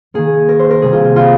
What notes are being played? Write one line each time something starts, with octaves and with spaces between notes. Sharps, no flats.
D#3 A#3 G#4
A#4
C5
A#4
C3 G3 A#3 G#4
F4
F4
F4